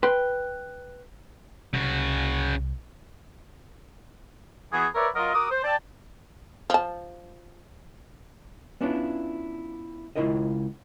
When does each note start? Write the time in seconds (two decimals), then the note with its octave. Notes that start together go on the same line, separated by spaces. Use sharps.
0.03 B4 G5 C6
1.74 C2 C#3 F#4
4.73 E3 B3 F#4 G#4
4.95 A#4 B4 C#5 D5 E5
5.15 F#3 F4 A#4 D#5
5.33 F#4 A#4 D6 D#6
5.50 C5
5.64 D5 G5 A5
6.70 F3 A5
8.81 B3 C#4 D4 E4 F4
10.16 C#2 C#3 E4 F4 A#4 D#5